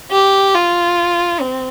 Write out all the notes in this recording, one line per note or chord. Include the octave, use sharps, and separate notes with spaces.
G4
F4
C4